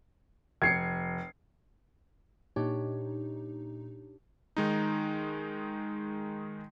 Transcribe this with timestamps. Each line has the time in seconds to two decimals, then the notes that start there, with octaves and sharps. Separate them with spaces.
0.62 F1 G#6 C7 C#7
2.56 A#2 D4 D#4 G4 C#5
4.57 D#3 G#3 D#4